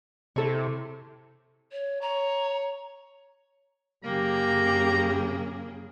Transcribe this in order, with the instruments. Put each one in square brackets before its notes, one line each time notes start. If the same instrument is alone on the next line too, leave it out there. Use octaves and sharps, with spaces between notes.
[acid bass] C3 [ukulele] E4 A4 C#5
[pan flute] C#5
[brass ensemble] C#5 [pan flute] A#5
[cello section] F#2 C#3 G#4 [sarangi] A#3 [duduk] G4 [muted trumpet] A#5